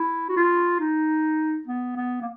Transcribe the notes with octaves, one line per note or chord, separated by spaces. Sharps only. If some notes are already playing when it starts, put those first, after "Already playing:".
Already playing: E4
F#4
F4
D#4
B3
B3
A#3